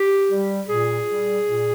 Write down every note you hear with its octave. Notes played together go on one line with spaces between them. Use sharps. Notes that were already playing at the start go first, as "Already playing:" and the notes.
Already playing: G4
G3
A#2 G#4
G3
A#2